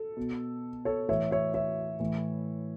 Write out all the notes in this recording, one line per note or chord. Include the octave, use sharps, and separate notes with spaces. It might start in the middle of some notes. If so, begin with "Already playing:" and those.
Already playing: A4
B2
A4 C#5
A2 E3 C#5 E5
C#5 E5
C#5 E5
A2 E3